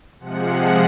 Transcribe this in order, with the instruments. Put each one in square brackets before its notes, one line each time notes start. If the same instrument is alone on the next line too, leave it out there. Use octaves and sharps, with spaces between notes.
[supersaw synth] C3 F3 G#3 F#5